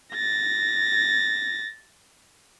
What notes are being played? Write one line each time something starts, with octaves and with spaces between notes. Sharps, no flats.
A6 A#6